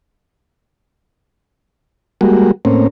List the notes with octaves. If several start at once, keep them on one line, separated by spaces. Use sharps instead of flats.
G3 G#3 A#3 F#4
A2 A#3 C4 C#4